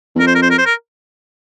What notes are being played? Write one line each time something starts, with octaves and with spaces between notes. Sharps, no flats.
E2
F2 A#4
C5
A#4
C5
A#4
C5
A#4